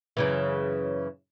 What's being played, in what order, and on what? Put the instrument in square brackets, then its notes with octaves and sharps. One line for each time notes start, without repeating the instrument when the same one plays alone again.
[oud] F#2 C#3 E3